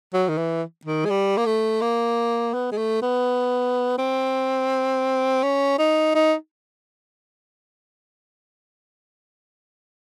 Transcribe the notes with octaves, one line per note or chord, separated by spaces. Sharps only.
F#3
D#3
E3
D#3
G#3
G3
A#3
A3
A#3
B3
G#3
A3
B3
C4
C#4
D#4
D#4